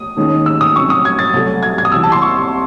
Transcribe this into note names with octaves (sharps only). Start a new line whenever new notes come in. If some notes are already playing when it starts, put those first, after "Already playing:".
Already playing: D#6
D#2 D#3 G#3 C#4
E6
D#6
C3 F#3 C#4 C#6
D#6
G#6
A6
C2 C3 F#3 A3
G#6
G#6
D#6
C2 C3 E3 E6
A5
C6
C#6